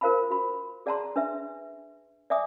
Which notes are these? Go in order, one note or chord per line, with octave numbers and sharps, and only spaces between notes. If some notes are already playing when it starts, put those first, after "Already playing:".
F4 A#4 C5 F5 A5 B5
F#4 B5
G#4 D5 F#5 A5 A#5 C6
D4 B4 E5
D5 E5 G#5 D6 D#6